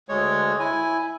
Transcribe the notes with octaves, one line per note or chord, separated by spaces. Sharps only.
D2 G#3 C#5
E4 G#5